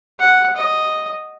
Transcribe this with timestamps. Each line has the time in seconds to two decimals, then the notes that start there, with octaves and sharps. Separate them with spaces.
0.19 F#5
0.56 D#5